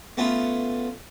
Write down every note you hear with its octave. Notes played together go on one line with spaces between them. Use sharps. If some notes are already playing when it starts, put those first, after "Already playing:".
A3 B3 C#4 F4